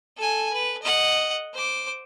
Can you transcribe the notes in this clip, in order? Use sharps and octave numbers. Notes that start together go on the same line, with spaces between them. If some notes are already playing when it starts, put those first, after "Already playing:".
A4 G#5
B4
D#5 F#5
C5 D6